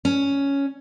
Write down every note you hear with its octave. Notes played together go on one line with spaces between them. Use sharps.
C#4